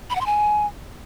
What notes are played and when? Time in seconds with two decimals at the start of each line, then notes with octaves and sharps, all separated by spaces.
0.10 B5
0.15 F#5
0.21 C6
0.26 G#5